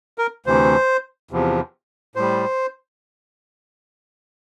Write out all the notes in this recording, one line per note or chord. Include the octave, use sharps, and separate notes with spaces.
A#4
D2 C3 E3 C5
E2 C3 F3
A2 G3 C5